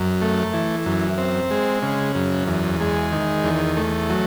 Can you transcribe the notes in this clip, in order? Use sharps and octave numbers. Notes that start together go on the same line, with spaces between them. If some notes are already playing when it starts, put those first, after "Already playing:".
Already playing: F#2
A3
E3
F#2
C4
G#3
C#3
F#2
E2
G#3
D#3
E2
A3
F#3